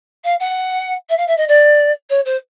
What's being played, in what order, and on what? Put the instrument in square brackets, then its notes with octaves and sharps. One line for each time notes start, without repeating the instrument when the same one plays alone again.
[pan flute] F5
F#5
E5
F5
E5
D#5
D5
C#5
C5